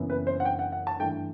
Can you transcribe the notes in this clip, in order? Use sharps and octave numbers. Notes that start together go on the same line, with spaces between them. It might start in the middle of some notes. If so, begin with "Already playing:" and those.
Already playing: F#1 F#2 E3 B3 E4
B4
C5
F#5
G5
F#5
F#5
A5
G2 E3 A3 G5